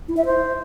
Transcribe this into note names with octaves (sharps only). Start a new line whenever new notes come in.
E4
E5
C5